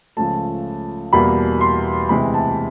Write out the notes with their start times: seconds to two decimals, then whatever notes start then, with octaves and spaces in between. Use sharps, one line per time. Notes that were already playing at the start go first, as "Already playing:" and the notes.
0.17 C#2 C#3 F3 A3 A5
1.13 E2 B2 G3 A#3 B5
1.61 C6
2.09 D2 C3 E3 G#3 B5
2.34 A5